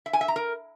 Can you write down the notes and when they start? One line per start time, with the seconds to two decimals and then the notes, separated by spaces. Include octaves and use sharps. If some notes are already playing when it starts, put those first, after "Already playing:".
0.06 E5
0.13 G#5
0.21 E5
0.28 A#5
0.36 A#4